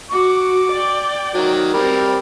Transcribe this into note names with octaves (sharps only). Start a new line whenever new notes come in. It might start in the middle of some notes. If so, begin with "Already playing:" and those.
F#4 D6
D5 G5
D#3 F#3
G3 C4 A#4